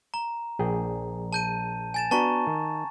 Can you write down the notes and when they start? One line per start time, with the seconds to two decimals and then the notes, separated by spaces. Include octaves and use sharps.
0.14 A#5
0.59 A#1 G#4 G5
1.33 A5 G6 D#7
1.94 G#5 A6 E7
2.11 B3 D4 F#4 A5 A#5 C#6
2.47 D#3